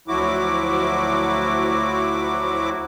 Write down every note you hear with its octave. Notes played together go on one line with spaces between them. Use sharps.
D2 F3 F#3 E4 F#4 D6